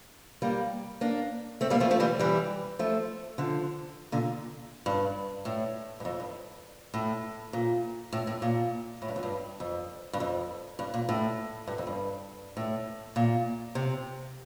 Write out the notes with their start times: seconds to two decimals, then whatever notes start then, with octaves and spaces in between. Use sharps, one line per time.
0.42 G3 A#3
1.01 A#3 D4
1.61 A3 C4
1.70 G3 A#3
1.80 F3 A3
1.91 F3 A3
2.00 E3 G3
2.19 E3 G3
2.79 F3 A3
3.38 D3 F3
4.12 A#2 D3
4.86 G2
5.45 A2
6.00 G2
6.05 F2
6.20 G2
6.94 A2
7.53 A#2
8.13 A2
8.27 A2
8.42 A#2
9.02 A2
9.09 G2
9.16 F2
9.23 G2
9.60 F2
10.13 G2
10.20 F2
10.79 G2
10.94 A#2
11.09 A2
11.67 G2
11.78 F2
11.87 G2
12.57 A2
13.16 A#2
13.75 C3